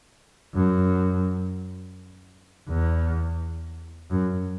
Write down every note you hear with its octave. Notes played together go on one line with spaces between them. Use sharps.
F#2
E2
F#2